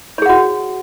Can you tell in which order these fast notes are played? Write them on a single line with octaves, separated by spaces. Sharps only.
C#5 G#4 F#5 F#4